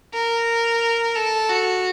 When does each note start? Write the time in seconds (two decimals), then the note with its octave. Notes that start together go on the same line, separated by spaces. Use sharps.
0.14 A#4
1.15 A4
1.49 F#4